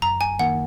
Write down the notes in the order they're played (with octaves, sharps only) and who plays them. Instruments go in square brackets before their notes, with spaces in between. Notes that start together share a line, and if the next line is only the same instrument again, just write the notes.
[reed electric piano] F#2 [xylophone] A#5
[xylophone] G#5
[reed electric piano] D#3 A#3 [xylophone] F#5